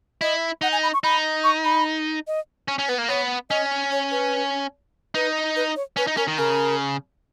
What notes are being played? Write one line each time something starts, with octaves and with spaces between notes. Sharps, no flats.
E4 D#5
D#4 F#5
G#5
B5
C#6
D#4 B5
C#6
B5
D#5
C#4
C#4
B3 B4
A#3
B3 C#5
C#4 D#5
C#5
B4
D#4 B4
B4
C#5
C#4 B4
D#4
C#4 A#4
D#3
C#3 A#4